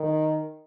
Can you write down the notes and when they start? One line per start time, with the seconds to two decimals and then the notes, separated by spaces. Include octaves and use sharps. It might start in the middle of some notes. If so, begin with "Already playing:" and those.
Already playing: D#3